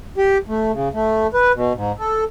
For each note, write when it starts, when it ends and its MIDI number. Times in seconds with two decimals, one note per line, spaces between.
0.18 0.38 67
0.48 0.72 57
0.73 0.88 49
0.94 1.27 57
1.34 1.52 71
1.54 1.73 47
1.75 1.92 44
1.99 2.24 69